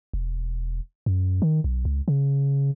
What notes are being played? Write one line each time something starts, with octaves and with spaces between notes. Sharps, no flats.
E1
F#2
D#3
B1
C#2
C#3